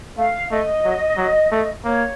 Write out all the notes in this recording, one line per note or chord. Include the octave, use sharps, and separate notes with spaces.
A3 F5
A3 D#5
F#3
F#3
A3
A#3 C#5